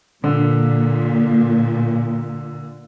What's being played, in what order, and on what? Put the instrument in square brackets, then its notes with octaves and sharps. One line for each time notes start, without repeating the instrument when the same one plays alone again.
[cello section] A#2 [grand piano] D3